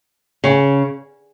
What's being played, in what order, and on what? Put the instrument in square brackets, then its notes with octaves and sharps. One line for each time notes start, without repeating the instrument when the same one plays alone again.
[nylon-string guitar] C#3